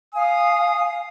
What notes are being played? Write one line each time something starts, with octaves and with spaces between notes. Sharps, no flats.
F5 G#5 D#6